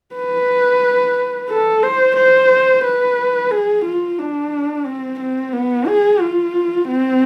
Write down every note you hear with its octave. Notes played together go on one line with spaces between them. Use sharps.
B4
A4
C5
C5
B4
G#4
F4
D4
C4
C4
B3
G#4
F4
C4